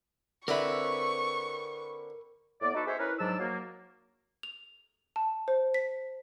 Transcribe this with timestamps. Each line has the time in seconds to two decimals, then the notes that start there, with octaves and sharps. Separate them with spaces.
0.48 D3 C4 E4 A#4 B4 E5 C#6
2.62 A2 B3 D5
2.75 D#4 F#4 A4 B4 D5
2.87 G#4 C5 C#5 E5
2.99 C#4 E4 A#4 B4
3.19 G#2 F#3 D4 A5 E6
3.39 F#3 A#3
4.43 F7
5.16 A5
5.48 C5
5.74 B6